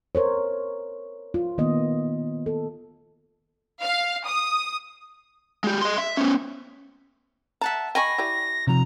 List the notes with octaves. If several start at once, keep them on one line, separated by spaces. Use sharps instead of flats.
A#4 C5 C#5
F4
D#3 A#3 B3 D#5
A4
F5
D#6
G#3 G4
D#5 C6
E5
B3 C#4
E5 F#5 A5 A#5
D#5 G5 G#5 B5 C#6 A#6
E4 G4 D5
C3 F3 A#5